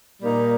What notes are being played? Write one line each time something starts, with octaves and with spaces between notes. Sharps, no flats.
A#2 G3 A#3 D#4